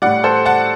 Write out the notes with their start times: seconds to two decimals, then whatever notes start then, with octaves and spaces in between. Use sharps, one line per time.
0.02 A2 G3 D5 F#5
0.24 A4 C5
0.46 F#5 A5